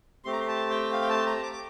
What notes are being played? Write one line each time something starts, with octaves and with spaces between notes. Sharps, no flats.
A3 C4 G4 C6
A#5
C6
A5
G5
F5
G5
A5
A#5
D6
D6